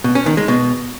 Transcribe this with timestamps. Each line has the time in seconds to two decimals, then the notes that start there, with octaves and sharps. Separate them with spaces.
0.04 B2
0.15 C#4
0.26 D#3
0.37 G#3
0.48 B2